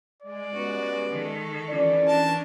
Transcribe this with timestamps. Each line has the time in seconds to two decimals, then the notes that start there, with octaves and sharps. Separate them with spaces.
0.22 G#3 D5
0.53 G3 B3 C#4 F#4
1.12 D#3 A4
1.67 F2 E3 C#4 D5
2.08 D4 A#4 A5